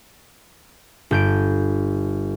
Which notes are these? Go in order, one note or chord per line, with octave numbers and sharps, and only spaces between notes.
G1 G6 D7